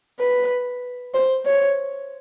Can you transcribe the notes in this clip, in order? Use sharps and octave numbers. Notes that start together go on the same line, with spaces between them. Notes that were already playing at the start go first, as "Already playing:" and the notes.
B4
C5
C#5